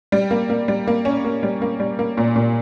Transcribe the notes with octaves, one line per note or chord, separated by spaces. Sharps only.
G3
A#3
A#3
G3
A#3
C#4
A#3
G3
A#3
G3
A#3
A#2
A#2